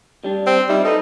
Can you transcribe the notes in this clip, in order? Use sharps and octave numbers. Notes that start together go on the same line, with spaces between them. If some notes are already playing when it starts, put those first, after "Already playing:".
G3 D4
C4
G3 D#4 E5
D#4 A4 B4